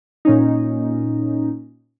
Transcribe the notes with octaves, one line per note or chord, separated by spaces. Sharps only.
A#2 C#4 D#4